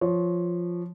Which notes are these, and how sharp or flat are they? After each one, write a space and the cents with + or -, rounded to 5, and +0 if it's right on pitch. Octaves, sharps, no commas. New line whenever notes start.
F3 +0 C#5 +0